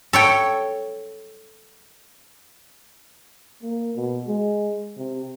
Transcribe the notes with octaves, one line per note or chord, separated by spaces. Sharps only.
A4 C#5 G5
A#3
B2
G#3
C3